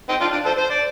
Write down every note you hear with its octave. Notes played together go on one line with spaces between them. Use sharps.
C4 D#4
D4 F4
D4
A4 C5
C5
D5